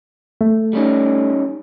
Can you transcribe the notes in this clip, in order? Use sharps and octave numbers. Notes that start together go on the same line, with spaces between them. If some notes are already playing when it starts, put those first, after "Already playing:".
A3
G3 C#4 D#4